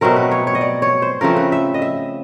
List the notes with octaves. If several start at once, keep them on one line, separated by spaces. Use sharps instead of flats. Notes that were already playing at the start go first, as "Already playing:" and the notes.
B2 F#3 A3 C4 A#4
B4
C#5
C#5
D#5
D5
C#5
C5
C#3 F3 A3 C4 A#4
B4
E5
D#5
E5